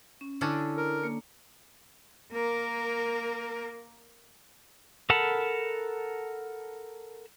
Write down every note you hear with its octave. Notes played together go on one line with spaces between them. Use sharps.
C#4
D3 C#4 D4 E4
A#4
A#3
A#3 A#4
A4 A#4 F#5 A5 B5